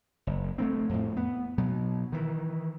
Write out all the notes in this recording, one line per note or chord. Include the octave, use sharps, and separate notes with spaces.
F#1
A3 B3 C4
F2 A2
B3
B2 F#3
D#3 E3